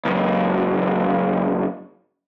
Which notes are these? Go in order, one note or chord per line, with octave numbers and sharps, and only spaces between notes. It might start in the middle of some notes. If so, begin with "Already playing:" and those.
C#2 F#2